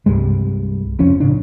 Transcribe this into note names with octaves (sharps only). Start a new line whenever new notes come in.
C2 G2 G3 G#3
F1 F3 C#4
A2 C#3 D4